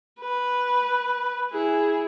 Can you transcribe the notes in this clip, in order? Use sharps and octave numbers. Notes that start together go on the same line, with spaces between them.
B4
E4 G#4